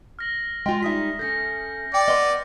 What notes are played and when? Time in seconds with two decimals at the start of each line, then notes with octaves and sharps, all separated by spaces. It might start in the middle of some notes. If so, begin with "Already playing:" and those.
0.19 F6 A#6 F#7
0.66 G#3 F4 G5
0.82 G3 D#4 E5 D#6 B6
1.19 C#4 A4 G6 A#6 C#7
1.94 D5 G5 C#7
2.08 B3 D#5 C6 D6 F6